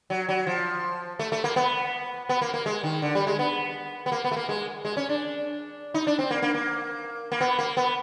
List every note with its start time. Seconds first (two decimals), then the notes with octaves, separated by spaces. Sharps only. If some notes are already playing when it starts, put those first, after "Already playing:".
0.10 F#3
0.29 F#3
0.47 F3
1.19 A3
1.32 A3
1.44 A#3
1.56 B3
2.29 B3
2.42 A#3
2.54 A#3
2.66 G#3
2.84 D#3
3.02 D3
3.15 G3
3.27 G#3
3.39 B3
4.06 B3
4.12 A#3
4.24 B3
4.31 A3
4.36 A#3
4.49 G#3
4.85 G#3
4.97 C#4
5.09 D4
5.94 D#4
6.07 D4
6.19 C4
6.31 A#3
6.42 A#3
6.55 A#3
7.32 A#3
7.41 B3
7.59 A#3
7.77 B3